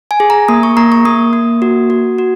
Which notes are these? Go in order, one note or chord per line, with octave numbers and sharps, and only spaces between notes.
G#5
G#4
A#5
A#3 D#6
C#6
A#3 A#5
C#6
A#3 D#6
A#3
F#4
F#4
F#4